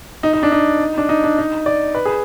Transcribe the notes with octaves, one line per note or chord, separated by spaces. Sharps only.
D#4
D#4
D4
D#4
D4
D#4
D4
D#4
D5
B4
G#4